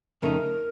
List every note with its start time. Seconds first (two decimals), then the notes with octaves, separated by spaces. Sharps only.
0.22 F2 C#3 A3 D#4 A#4